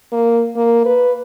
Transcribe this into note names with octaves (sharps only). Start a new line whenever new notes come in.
A#3
A#3
B4